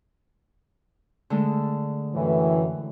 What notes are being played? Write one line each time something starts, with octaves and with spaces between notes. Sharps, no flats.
D3 G#3 A3
F#2 A2 E3